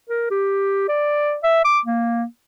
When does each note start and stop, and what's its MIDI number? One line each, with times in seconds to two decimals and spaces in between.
0.09 0.29 70
0.31 0.88 67
0.89 1.37 74
1.43 1.64 76
1.65 1.79 86
1.86 2.24 58